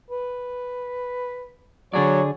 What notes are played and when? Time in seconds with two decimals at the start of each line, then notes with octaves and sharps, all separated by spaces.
0.11 B4
1.93 D3 F#3 G#4 C#5 D5